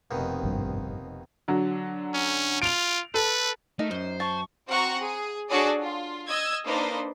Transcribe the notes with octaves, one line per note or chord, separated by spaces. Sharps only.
F1 D#2 B2 D#3 C4
G#1 G2
D3 F#3
C#4
F4 D7 F7
A4 B4
A3 D#4 A#4
F#2 C5
A5 C#6
C4 F#4 F#5 A#5 C#6
G#4
D4 F#4 G#4 A4 C#5 D5
F4
D#5 E6 G#6
A#3 D4 D#4 B4 C5